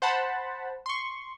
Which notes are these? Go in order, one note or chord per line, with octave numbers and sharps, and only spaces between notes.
C5 F#5 A5 B5
C6 C#6